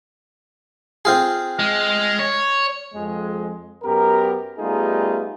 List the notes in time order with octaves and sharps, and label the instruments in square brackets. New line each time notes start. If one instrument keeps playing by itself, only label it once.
[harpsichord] C4 F4 G#4
[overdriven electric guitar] G#3 [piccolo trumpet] F6
[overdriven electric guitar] C#5 [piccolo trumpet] G#6
[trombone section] F2 G#3
F#2 B3 G4 A#4
G3 A3 B3 D#4 F4 G#4